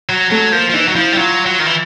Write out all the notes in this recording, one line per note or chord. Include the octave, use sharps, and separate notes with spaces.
F#3
F#3 A3
F3 A#3
F3
E3 D#4
F#3
F3 E4
G3
F#3 F4
F#3
D#3
E3